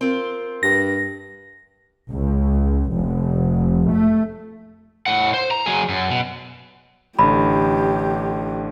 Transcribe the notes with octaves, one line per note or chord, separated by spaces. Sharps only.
C4 F4 A#4
G2 A#6
C#2
F1
A3
A2 F#5
C5
A#5
F#3 G#4
F#2
B2
A1 D3 G4 B5